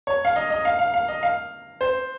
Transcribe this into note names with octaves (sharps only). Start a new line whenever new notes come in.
C#5
F5
D#5
D#5
F5
F5
F5
D#5
F5
C5